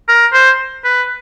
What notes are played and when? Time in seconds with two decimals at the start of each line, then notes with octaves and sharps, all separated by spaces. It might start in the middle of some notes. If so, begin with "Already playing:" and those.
0.09 A#4
0.33 C5
0.85 B4